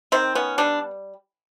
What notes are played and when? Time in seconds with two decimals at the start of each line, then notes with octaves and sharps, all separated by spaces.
0.12 D#3 C4
0.35 B3 C#4
0.58 G3 D4